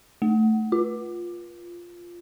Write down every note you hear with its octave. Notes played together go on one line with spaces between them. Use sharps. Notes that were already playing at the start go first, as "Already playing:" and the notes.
A3
F4